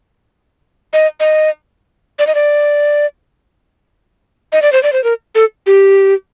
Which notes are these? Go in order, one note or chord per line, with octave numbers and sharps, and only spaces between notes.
D#5
D#5
D5
D#5
D5
D#5
D5
C5
D5
C5
A#4
A4
G4